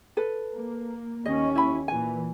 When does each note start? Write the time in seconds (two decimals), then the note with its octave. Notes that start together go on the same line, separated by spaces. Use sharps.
0.17 A4 B4
0.53 A#3
1.26 D#2 C#4 D#5
1.55 E4 B5
1.88 A#2 E3 G#5